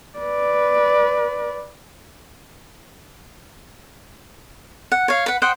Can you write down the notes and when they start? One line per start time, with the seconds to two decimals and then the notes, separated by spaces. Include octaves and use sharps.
0.18 B4 D5
4.92 F#5
5.08 C#5 F5
5.26 B4 F#5
5.42 C5 D#5 F#5 G5